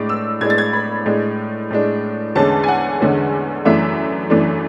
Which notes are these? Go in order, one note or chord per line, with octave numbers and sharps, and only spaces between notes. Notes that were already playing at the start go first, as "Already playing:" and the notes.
Already playing: A2 G#3 D4 D6
E6
A2 G#3 D4 G#6
A6
G#6
B5
A2 G#3 D4
A2 G#3 D4
E2 D3 G#3 C#4 A5
G#5
F#5
E2 D3 G#3 C#4
F#2 E3 A3 D4 E5
F#2 E3 A3 D4